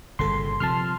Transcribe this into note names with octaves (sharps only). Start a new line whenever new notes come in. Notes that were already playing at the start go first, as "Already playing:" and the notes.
G1 A#2 C#3 A4 C6
C3 F3 A5 C6 F6